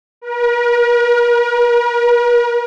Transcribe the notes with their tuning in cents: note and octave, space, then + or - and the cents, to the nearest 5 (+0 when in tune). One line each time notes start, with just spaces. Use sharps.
A#4 +45